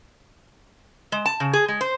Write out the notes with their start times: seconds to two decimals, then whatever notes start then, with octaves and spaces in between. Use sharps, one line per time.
1.12 G#3
1.26 A5
1.40 C#3
1.53 G#4
1.68 G#3
1.81 C5